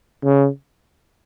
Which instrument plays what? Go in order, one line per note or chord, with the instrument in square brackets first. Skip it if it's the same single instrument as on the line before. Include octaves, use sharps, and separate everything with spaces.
[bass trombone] C#3